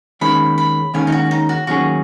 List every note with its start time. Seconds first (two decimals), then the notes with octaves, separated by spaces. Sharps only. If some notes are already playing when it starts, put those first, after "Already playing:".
0.21 D#2 D#3 G#3 C#4 B5
0.58 B5
0.94 D#2 D#3 G#3 C#4 G#5
1.07 D#4
1.12 F#4
1.31 D#4
1.49 F#4
1.67 D#2 D#3 F#3 C#4 F#4 G#4